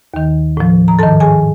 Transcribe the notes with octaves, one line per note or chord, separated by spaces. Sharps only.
D#2 D#3
A2 F3
A#5
G#2 D#3 A4 A5
G#4 G#5